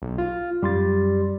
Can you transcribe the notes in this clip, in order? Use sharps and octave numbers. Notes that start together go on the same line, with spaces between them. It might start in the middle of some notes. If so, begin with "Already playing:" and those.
B1
F4
F#2 G3 C6 A6